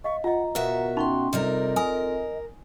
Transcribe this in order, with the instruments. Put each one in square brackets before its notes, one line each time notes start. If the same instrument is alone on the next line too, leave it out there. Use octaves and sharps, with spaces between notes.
[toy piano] D#5 F5 [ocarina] C#6
[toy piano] F4 D#5 [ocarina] F#5 [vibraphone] A#5
[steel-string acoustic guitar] B2 F#4 E5 [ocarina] A#4 [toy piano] B4 F5
[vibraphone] C#4 G5 C6 [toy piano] D#4 B5
[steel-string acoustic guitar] C3 G3 A#4 [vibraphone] C4 F4 A4 [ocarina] D#5
[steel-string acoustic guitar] A#4 [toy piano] G#5 D#6